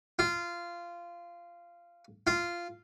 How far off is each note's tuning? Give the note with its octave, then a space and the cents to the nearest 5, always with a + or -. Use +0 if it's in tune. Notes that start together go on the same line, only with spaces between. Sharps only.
F4 -15
F4 -10